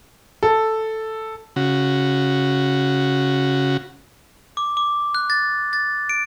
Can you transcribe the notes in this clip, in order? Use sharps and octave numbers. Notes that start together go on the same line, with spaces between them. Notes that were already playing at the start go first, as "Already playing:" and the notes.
A4
C#3 F#4
D6
D6
F#6
A6
A6
D7